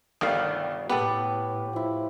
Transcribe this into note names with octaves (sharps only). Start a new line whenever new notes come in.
G1 C2 D#3 G3 A3 F5
A2 B3 G4 A4 B4
F3 E4